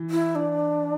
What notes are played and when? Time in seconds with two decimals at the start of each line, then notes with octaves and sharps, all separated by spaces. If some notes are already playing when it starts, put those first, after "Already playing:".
Already playing: E3
0.10 E4
0.35 D4